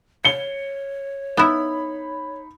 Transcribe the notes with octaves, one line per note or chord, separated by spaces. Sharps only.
C#5 C#7 G7
B3 D#4 E4 B5